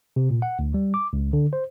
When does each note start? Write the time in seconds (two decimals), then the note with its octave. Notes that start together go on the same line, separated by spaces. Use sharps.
0.16 C3
0.30 A#2
0.42 F#5
0.59 D2
0.74 G3
0.94 D6
1.13 C#2
1.33 D3
1.53 C5